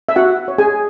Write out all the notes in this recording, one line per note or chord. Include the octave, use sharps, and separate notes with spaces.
E5
F#4 F#5
C#5
G#4 G#5